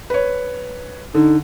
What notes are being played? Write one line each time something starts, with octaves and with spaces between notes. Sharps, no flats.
B4 C#5
D3 D#4